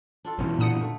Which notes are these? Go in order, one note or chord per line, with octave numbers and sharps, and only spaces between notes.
D4 F4 A4
F#2 B2 E3 C#4
A#2 D3 D#4 D#6 C#7
A3